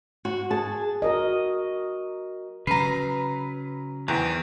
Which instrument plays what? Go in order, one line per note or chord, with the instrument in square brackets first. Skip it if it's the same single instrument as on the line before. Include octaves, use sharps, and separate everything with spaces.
[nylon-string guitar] F#4
[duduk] G#4 [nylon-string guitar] A5
[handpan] F#4 A#4 D#5
[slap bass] C#3 F#3 [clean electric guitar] B4 [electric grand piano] A#5 C7
[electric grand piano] E2 [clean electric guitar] D#3 C4 G4